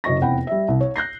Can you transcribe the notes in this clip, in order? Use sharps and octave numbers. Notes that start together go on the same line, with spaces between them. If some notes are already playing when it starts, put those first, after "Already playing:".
F#1 F#3 D#5 C#6 A#6
F1 E2 C4 F#5 G5 B5
G3 E5
C2
C#5
F#6 G6 A#6 C7